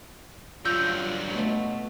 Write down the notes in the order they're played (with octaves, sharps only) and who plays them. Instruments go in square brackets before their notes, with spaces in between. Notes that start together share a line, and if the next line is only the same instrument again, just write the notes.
[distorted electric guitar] G2 F#3 [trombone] F4 [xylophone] E6 G6
[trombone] B2 [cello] A3